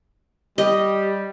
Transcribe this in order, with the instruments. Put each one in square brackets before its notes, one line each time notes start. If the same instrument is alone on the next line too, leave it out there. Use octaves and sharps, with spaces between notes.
[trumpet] G3 [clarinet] G4 [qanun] D#5